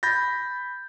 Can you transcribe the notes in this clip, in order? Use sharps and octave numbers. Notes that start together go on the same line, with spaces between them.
B5 G6 A6 A#6